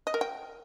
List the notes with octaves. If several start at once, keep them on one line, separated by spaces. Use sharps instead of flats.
D#5
A#4
G5